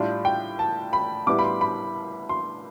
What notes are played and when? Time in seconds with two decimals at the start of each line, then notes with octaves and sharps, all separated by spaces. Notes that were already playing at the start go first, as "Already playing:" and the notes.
Already playing: A2 G3 D4 F4
0.25 G5
0.59 A5
0.93 B5
1.27 A2 G3 B3 E4 D6
1.39 B5
1.44 C6
1.61 B5
2.29 C6